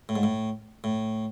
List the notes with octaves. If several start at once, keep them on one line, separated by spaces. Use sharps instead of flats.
A2
G#2
A2
A2